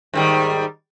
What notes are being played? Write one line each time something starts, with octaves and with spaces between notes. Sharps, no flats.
G#2 D#3 G3